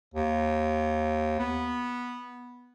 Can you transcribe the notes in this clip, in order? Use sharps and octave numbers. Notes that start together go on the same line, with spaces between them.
D#2
B3